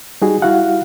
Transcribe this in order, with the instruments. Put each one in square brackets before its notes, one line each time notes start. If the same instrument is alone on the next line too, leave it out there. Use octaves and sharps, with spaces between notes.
[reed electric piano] G3 D#4 F#4 G#4
G3 E4 F#4 F5 F#5